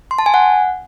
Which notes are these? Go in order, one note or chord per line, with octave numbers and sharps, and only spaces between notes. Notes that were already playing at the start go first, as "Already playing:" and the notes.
C6
A5
G#5
F#5